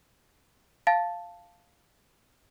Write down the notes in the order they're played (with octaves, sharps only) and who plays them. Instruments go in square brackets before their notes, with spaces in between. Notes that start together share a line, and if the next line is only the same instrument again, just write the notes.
[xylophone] F5 A5 A6